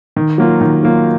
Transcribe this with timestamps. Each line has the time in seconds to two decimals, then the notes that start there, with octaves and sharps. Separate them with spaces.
0.17 D#3
0.38 F#3 A#3 F4
0.61 D#3
0.83 F#3 A#3 F4